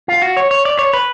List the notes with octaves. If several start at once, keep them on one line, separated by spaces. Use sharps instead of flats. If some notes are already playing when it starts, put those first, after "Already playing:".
F4
F#4
C#5
C#5
D5
C#5
B4